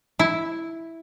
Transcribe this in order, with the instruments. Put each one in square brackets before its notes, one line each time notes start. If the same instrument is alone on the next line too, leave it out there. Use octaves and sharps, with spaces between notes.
[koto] E4